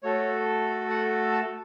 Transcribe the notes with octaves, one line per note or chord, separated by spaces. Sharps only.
A3 F#4 A4 C#5
F#5
A5